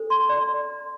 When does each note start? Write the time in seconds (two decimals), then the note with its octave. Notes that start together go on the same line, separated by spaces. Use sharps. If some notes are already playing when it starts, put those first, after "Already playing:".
Already playing: D4 A4 C5
0.10 C6
0.21 A#5
0.29 D5
0.38 C6